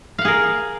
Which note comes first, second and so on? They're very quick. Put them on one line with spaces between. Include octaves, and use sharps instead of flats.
F5 F#5 G#4 A#4